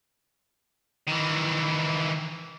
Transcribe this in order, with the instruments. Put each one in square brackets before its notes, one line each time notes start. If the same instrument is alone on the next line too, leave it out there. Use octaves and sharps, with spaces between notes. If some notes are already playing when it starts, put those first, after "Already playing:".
[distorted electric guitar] D#3 E3